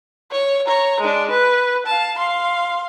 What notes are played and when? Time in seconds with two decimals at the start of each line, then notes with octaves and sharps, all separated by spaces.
0.31 C#5
0.66 C#5 A#5
1.00 G#3 D4
1.30 B4
1.86 F5 A5
2.18 F5 C6